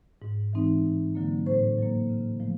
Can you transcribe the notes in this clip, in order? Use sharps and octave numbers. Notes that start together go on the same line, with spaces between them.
G#2
E3 G#3 C4 D#4
G2
D3 F#3 A#3
A2 C5
F#3 A#3
C#3
F3 A3